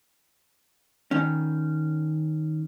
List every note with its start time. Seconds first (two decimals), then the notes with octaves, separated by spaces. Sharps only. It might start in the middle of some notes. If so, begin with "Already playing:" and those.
1.11 D#3 C#4